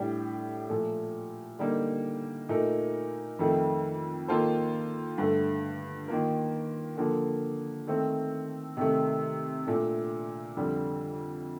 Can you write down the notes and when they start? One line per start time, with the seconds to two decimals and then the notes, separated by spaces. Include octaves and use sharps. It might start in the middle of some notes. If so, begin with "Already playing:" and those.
Already playing: A2 G3 D4 G4
0.69 A#2 F3 A3
1.59 D3 G3 A#3 D#4
2.49 A#2 A3 D#4 A#4
3.39 F2 D#3 A3
4.28 D#3 A#3 F4 A4 C5
5.18 G2 D3 A3
6.08 D#3 A#3 F4 A#4
6.97 D3 F3 A#3
7.87 D#3 A3 C4
8.77 C3 D#3 A3
9.67 A#2 A3 D4
10.57 F2 D3 G3